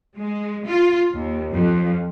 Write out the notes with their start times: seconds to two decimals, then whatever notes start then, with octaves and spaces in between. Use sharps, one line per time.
0.16 G#3
0.65 F4
1.13 D#2
1.52 F2